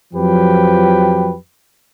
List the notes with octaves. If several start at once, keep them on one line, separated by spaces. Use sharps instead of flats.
F2 F3 F#3 G4 B4 G5